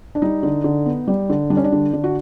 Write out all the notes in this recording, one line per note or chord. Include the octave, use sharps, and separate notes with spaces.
D4
G3 D#4
D3
D3
B3
G3
D3
G3 D4
C#4
D4
D3
D3
F#4